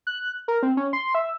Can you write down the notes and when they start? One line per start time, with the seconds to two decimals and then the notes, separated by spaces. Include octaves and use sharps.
0.07 F#6
0.48 A#4
0.63 C4
0.77 C#4
0.93 C6
1.15 E5